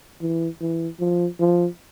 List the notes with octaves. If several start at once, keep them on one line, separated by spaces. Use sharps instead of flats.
E3
E3
F3
F3